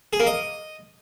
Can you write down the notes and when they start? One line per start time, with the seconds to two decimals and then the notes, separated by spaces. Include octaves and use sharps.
0.13 G#4
0.20 A#3
0.27 D#5